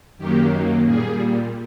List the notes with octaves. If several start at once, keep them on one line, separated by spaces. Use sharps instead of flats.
F#2 D#3 F#3 A#3 G4
A#2 G3 G#4